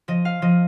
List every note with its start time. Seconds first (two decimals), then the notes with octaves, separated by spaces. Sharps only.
0.08 F3 D#5
0.25 F5
0.42 F3 D#5